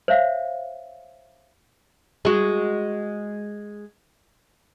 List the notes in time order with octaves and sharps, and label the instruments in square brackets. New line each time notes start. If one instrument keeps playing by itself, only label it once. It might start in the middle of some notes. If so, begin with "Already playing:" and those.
[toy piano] C5 C#5 E5 F5
[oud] G#3 F#4